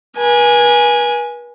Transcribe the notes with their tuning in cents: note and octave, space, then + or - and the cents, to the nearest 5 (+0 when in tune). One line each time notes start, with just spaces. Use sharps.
B4 -40 G#5 +0